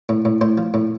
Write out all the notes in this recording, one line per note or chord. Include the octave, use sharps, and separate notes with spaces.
A2
A2
A2 C5
F3
A2